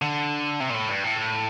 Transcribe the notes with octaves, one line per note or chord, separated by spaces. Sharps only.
D3
C3
A#2
A2
G2
A2